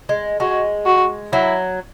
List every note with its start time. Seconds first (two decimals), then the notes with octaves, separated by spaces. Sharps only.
0.09 G#3
0.40 G#3 F#4
0.86 F#4
1.33 F#3 E4